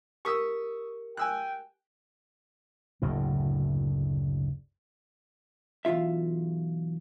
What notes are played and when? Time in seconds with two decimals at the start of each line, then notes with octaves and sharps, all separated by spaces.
0.25 G4 A#4 C#6 D#6 E6 B6
1.17 G5 G#5 E6 F#6
3.02 F#1 D2 A2
5.85 B1 E2 G#2 F4 E5